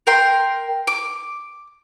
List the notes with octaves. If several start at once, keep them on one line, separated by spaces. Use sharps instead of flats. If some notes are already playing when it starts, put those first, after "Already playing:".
A#4 G5 C6
D6